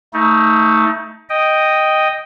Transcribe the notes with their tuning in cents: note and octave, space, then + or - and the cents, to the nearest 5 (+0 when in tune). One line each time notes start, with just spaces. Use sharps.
A3 +10 D#4 +30
D#5 +0 G5 +0